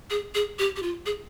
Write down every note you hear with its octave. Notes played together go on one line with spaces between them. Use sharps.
G#4
G#4
G4
G4
F4
G#4